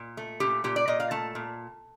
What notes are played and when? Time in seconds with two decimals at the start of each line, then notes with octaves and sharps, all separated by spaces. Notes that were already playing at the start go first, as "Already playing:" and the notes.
Already playing: A#2
0.17 A3
0.40 A#2 G4
0.64 A#2 G4
0.76 D5
0.88 A#2 D#5
1.00 F5
1.11 A3 A5
1.35 A#2